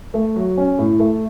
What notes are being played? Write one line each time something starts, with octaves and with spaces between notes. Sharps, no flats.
A3
F#3
C#4
A2
A3